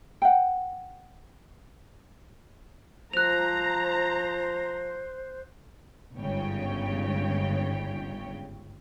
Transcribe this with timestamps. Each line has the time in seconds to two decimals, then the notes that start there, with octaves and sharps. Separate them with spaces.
0.22 F#5 G5
3.13 F3 C5 A#5 F#6 F7
6.16 G1 G#2 C#3 C#5 G5